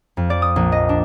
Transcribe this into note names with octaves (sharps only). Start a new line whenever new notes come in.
F2
D5
D#6
A#1
D#5
D4